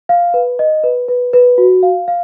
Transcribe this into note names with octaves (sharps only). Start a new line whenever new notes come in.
F5
B4
D#5
B4
B4
B4
F#4
F5
F5